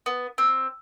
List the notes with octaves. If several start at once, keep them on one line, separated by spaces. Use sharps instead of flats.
B3
C4